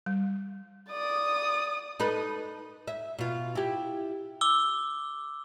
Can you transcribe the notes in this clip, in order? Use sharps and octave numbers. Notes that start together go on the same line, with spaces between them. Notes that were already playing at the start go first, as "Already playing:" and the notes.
G3
D5 D#6
D#4 A4 B4
E5
B2 F4
E4 G4
D6 E6 G7